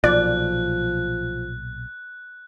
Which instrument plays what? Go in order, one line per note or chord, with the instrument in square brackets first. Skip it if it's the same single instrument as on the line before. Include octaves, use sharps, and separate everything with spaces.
[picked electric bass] B1 A#2 [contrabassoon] F3 [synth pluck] D5 [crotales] F#6